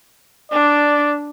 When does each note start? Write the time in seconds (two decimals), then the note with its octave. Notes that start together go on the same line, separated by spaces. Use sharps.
0.52 D4 D5